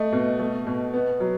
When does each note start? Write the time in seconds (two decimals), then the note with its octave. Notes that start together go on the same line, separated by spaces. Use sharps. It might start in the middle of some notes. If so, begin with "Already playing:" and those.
Already playing: A3 D#5
0.12 B2
0.40 A3
0.67 B2
0.94 B3
1.20 F#3